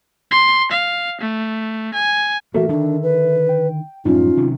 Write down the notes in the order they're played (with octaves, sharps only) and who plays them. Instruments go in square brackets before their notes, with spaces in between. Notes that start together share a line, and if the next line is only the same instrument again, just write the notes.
[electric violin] C6
F5
A3
G#5
[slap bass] E3 A3 A#3 [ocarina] F#4 [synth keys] A4 A#4 E5
[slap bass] D3 D#3 [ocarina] D4
[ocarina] B4
[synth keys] G5
[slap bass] F#2 A2 F3 [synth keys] C#4 D#4 [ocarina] F4
[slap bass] C3 D#3 F#3